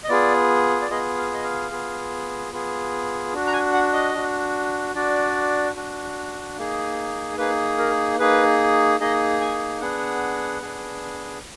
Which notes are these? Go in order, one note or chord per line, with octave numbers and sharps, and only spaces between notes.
D#5
B3 F4 G#4 D5
D5
B3 F4 G#4 D#5
F5
D#5
F5
B3 F4 G#4
B3 F4 G#4
D4 F#4
A#5
G#5
F#5
D#5
D4 F#4
D4 F#4 D5
D4 F#4
A#3 D#4 G#4
A#3 D#4 G#4 B4
A#4
A#3 D#4 G#4 B4
A#3 D#4 G#4 D#5
G#5
B3 D4 G#4 F#5
B3 D4 G#4